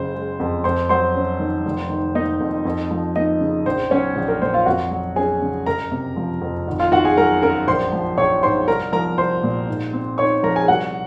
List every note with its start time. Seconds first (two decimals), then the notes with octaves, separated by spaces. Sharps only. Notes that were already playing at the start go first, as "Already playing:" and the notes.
Already playing: F#1 C#3 C5
0.14 G#3
0.40 F2
0.64 F2 C5 C6
0.89 F#3 C5 C6
1.15 C#4
1.40 D#3
1.65 F1
1.90 D#3
2.15 A#3 D#4 D#5
2.40 F2
2.65 F2
2.91 F3
3.16 A#3 D#4 D#5
3.41 C#3
3.66 A#1 C5
3.91 F#3 C#4 C#5
4.16 A#1
4.28 A#4
4.42 A#2 C5
4.54 F4 F5
4.66 F2 F#4 F#5
4.91 F#3
5.16 C#4 G#4 G#5
5.42 C#3
5.66 F#1 A#4 A#5
5.91 C3
6.17 F3
6.41 F2
6.68 G#1
6.80 F4 F5
6.91 D#3 F#4 F#5
7.05 G#4 G#5
7.17 F#3 A#4 A#5
7.42 F#2 A#4 A#5
7.67 A#1 C5 C6
7.93 F3
8.18 A#1 C#5 C#6
8.43 G#2 C5 C6
8.67 C2 A#4 A#5
8.93 F3 A#4 A#5
9.18 C2 C5 C6
9.43 A#2
9.69 G#2
9.93 C4
10.18 D#4 C#5 C#6
10.43 F3 A#4 A#5
10.56 G#4 G#5
10.68 C2 F#4 F#5